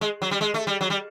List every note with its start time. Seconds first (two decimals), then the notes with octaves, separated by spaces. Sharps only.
0.01 G#3
0.22 F#3
0.31 G3
0.41 G#3
0.54 A3
0.67 G3
0.81 F#3
0.90 G3